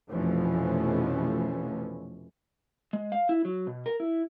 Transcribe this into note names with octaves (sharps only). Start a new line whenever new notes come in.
F1 B2 E3 F3 A3 C#4
G#3
F5
E4
F#3
B2
A#4
E4